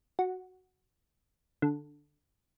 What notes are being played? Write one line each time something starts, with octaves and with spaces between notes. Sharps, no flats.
F#4
D3